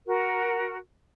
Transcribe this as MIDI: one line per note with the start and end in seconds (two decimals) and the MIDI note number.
0.07 0.76 66
0.07 0.76 70